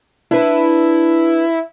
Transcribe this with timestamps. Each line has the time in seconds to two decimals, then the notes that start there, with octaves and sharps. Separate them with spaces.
0.31 D4 E4 B4